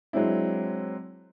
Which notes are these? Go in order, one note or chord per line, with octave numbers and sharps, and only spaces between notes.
F#3 G#3 C4 D4 E4